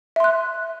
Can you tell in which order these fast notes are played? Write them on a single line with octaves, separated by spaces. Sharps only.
E5 C6 F#6